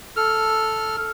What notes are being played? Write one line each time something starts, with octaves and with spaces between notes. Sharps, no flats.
A4 F6